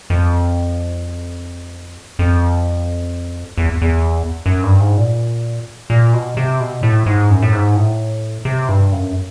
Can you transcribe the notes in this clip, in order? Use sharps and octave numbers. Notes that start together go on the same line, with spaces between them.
F2
F2
E2
E2
F#2
G2
G#2
A#2
A#2
B2
C3
B2
A2
G#2
F#2
A2
G#2
A2
C3
G2
F#2